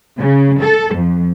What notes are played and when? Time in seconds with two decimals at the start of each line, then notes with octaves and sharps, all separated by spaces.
0.18 C#3
0.61 A4
0.94 F2